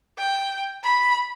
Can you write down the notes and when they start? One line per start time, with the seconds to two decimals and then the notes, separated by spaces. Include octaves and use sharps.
0.18 G5
0.84 B5